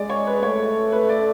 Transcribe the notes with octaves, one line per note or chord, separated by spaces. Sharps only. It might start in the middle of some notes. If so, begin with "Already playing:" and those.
Already playing: G#3 D5
C#5
B4
A3 C#5
B4
D5